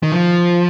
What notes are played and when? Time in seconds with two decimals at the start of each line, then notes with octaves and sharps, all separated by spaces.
0.03 D#3
0.12 F3